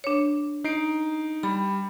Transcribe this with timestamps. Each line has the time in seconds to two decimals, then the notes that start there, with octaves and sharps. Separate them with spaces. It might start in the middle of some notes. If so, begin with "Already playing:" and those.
0.04 D4 C#5
0.64 D#4 C7 D7
1.43 G3 B5